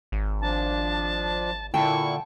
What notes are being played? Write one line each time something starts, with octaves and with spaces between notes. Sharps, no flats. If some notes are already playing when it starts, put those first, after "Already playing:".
G#1
F3 D4 A5
A#2 D3 E4 G5 A5 C#6